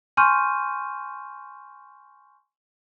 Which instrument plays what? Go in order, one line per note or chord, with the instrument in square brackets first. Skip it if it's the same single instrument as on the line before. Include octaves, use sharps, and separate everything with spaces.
[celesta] G#5 C6 C#6 F6 G6 D#7